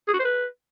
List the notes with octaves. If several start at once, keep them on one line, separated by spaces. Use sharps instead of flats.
G#4
F#4
C5
B4